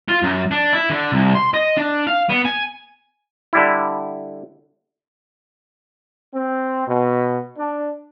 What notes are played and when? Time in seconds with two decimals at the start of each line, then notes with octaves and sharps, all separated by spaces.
0.09 F4
0.23 F#2
0.51 D4
0.73 E4
0.90 D3
1.12 C2
1.35 C6
1.54 D#5
1.77 D4
2.07 F5
2.29 B3
2.45 G#5
3.53 D3 G3 E4
6.33 C4
6.87 B2
7.58 D4